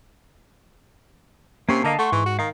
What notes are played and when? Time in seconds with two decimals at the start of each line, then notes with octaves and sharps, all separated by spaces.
1.69 C3 A#3 C#4 C7
1.84 D3 A#3 D#5 F5 A5
1.99 A3 F#5 C6 C#6
2.12 G#2 E3
2.26 F#4
2.39 D#3 F5